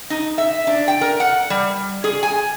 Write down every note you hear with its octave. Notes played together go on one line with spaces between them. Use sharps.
D#4
E5
D4
G5
A#4
F#5
G3
G#4
G#5